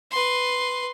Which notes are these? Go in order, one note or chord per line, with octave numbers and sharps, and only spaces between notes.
B4 C6